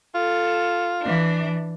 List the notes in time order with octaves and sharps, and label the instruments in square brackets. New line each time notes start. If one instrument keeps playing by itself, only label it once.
[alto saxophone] F4 [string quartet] A4
[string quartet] E3 D4